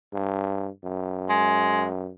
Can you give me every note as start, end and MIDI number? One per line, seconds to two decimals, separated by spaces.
0.13 0.69 43
0.84 2.11 42
1.30 1.86 56